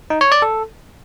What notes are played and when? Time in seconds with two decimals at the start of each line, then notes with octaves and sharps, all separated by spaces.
0.10 D#4
0.21 C#5
0.32 D5
0.42 A4